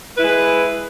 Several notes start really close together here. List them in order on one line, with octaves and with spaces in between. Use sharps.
B4 E4 G#3